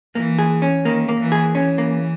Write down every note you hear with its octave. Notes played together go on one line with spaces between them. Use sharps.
E3 A#3
G#4
C#4
D#3 A#3
A#3
E3
G#4
E3 C#4
A#3